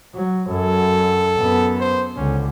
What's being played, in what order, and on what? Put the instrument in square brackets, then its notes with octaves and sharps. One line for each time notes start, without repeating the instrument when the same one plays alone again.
[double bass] F#3
[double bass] F#2 F#3 [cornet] A4
[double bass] F#2 B3
[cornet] C5
[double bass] C#2 D3 [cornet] C#4